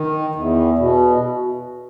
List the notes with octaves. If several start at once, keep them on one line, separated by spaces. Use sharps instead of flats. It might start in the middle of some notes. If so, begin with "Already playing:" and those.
Already playing: D#3
E2
B2